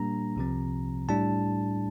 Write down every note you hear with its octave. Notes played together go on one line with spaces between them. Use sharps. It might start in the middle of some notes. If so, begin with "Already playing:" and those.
Already playing: A#2 G3 A#3 D4 A#5
C2 C3 F3 C4
A2 G3 D4 A5